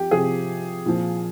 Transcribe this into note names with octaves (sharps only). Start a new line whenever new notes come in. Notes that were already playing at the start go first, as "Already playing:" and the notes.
Already playing: F3 G4
C3 F3 G#4
A#2 F3